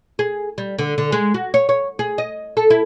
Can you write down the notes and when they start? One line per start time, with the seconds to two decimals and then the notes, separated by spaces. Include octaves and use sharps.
0.19 G#4
0.58 G3
0.78 D3
0.98 D3
1.12 G#3
1.34 F#4
1.54 C#5
1.69 C#5
1.99 G#4
2.18 D#5
2.57 A4
2.70 E4